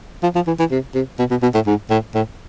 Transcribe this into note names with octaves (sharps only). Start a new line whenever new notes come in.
F3
F3
E3
E3
C3
C3
B2
B2
B2
A2
G#2
A2
A2